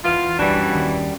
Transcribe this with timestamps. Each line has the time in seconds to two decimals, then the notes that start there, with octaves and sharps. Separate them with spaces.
0.04 E2 F4
0.39 E1 C2 F#2 E3 G3 D4 F#4 A5
0.75 D#2 D#3